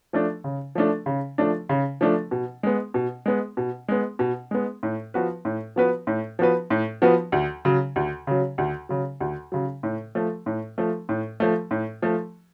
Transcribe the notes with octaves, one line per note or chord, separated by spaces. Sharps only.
F3 A3 D4
C#3
F3 A3 D4
C#3
F3 A3 D4
C#3
F3 A3 D4
B2
G#3 B3
B2
G#3 B3
B2
G#3 B3
B2
G#3 B3
A2
F3 B3 F#4 B4
A2
F3 B3 F#4 B4
A2
F3 B3 F#4 B4
A2
F3 B3 F#4 B4
D2
C#3 F#3
D2
C#3 F#3
D2
C#3 F#3
D2
C#3 F#3
A2
F3 A3
A2
F3 A3
A2
F3 A3
A2
F3 A3